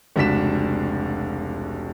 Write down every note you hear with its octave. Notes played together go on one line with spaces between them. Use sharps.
F1 C#2 D4 F#4 B6 E7